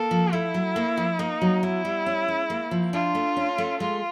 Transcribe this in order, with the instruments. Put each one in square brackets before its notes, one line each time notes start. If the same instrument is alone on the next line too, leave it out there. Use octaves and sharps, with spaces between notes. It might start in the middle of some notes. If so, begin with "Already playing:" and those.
Already playing: [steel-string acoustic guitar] A#3 [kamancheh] A4
[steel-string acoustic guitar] F3
[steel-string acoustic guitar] A3 [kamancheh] E4
[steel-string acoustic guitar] F#3
A#3
F3
[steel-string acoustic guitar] A#3 [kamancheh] D#4
[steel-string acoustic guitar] F#3
[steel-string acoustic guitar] B3 [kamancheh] E4
[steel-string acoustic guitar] G3
C#4
G#3
A#3
F3
[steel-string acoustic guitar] D4 [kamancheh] F4
[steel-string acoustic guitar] A3
C#4
A3
[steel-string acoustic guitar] G#3 [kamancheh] F4